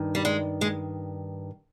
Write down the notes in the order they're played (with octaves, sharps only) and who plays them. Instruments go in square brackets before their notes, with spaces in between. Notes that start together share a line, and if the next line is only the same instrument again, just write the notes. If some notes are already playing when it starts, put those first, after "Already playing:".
Already playing: [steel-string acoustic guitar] G2 D#3
G3
G#3
G#3